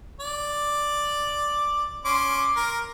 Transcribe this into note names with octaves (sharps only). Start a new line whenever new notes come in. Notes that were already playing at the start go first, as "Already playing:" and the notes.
D5
C#4 C6 D6
A#4